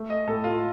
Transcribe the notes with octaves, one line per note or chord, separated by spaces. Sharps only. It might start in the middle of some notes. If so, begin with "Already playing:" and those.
Already playing: A3
D#5
A2 A4
F4